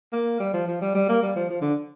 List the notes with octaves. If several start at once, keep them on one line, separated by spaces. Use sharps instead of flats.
A#3
G3
F3
F3
G3
G3
A#3
G3
F3
F3
D3